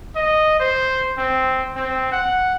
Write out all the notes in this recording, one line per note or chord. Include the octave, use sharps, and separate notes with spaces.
D#5
C5
C4
C4
F#5